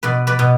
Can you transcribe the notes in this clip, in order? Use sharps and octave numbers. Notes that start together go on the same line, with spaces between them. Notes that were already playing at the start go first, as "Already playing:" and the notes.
B2 B4 D5
B4 D5
B2